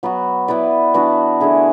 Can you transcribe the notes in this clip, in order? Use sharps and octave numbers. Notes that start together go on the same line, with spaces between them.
F#3 B3 F#4
B3 E4 B4 D5
E3 B3 D4 F#4
D3 A3 E4 G#4